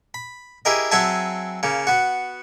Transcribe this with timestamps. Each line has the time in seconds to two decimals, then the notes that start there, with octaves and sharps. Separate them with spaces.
0.14 B5
0.65 E4 G4 G#4 A#4 D#5
0.91 F#3 C4 G#4 E5 G#5 A5
1.63 C#3 A#3
1.87 B3 F#4